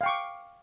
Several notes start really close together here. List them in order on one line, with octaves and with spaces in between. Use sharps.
F5 G5 C#6 D6